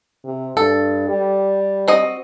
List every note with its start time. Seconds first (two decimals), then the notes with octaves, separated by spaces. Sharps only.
0.24 C3
0.57 G2 A4
1.08 G3
1.88 C4 F#4 D#5